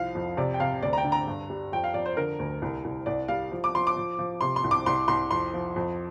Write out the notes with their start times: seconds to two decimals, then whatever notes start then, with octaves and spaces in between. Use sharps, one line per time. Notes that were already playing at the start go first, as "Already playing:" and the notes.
Already playing: C2 F3 F5
0.15 F2
0.37 C3 D5
0.54 G5
0.60 C3 F5
0.82 D2 D5
0.93 A#5
0.98 G5
1.04 D3
1.12 A#5
1.27 G2
1.50 G3
1.72 F2 G5
1.84 F5
1.94 F2 D5
2.06 C5
2.17 D3 A#4
2.39 D2
2.62 C2
2.85 C2
3.06 C2 D5
3.28 G3 F5
3.51 F3
3.64 D6
3.74 F3 C6
3.87 D6
3.97 F3
4.19 F3
4.41 C3 C6
4.56 C6
4.64 C2
4.71 D6
4.86 C2 C6
5.08 C2 C6
5.31 F2 C6
5.54 F3
5.76 F2